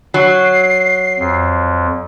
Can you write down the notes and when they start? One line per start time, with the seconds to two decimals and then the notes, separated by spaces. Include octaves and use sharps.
0.14 F#3 C7
1.19 F2